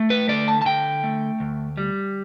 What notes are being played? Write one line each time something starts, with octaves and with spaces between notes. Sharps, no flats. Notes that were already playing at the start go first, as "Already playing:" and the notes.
Already playing: A3
B4
D3 D5
A5
A5
D3 G5
A3
D2
G3